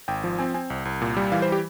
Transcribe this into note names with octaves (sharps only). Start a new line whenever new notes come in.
G#1 G5
F3
C4 G#5
C4 G#5
C2
C2
A#2
G3
E3 F5
C5
G4